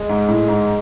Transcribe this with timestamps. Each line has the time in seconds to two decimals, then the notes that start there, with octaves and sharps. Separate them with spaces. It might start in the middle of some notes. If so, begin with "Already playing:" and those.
Already playing: G#3
0.09 G#2
0.29 A2
0.48 G#2